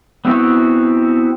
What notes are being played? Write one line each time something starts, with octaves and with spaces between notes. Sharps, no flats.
B3 C4 E4 F#4 G4